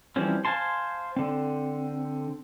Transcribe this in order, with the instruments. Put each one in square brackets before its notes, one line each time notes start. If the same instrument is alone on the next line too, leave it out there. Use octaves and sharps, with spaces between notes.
[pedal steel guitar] E3 F3 G3 C4 C#4
C5 F5 G#5 A5 C6
D3 C4